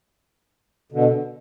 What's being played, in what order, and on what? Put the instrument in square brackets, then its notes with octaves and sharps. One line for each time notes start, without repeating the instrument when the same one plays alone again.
[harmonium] B2 D3